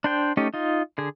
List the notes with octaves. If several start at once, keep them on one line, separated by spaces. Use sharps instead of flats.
D4 C5 G5
A3 C#4 D#4 G4
D#4 F4
D3 G#4